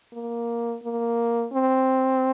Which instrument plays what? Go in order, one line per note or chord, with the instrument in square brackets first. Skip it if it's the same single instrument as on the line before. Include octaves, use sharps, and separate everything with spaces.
[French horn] A#3
A#3
C4